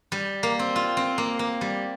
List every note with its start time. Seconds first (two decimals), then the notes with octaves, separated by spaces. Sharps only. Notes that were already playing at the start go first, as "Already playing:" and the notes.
0.12 G3
0.43 A#3
0.59 C4
0.76 F4
0.97 C4
1.18 A#3
1.39 A#3
1.61 G3